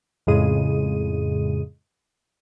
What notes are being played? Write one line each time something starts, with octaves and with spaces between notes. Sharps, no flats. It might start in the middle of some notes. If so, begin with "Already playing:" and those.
F2 A2 C#3 G#3 G#4 D#7